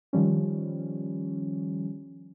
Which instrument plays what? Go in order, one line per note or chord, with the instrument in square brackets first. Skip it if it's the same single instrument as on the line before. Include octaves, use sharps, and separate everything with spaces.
[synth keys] D#3 F3 G3 C#4